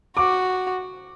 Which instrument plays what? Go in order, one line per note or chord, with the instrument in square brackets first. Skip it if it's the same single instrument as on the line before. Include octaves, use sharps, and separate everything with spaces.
[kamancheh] F#4 [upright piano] D6